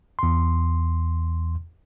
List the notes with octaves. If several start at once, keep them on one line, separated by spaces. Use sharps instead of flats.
E2 C6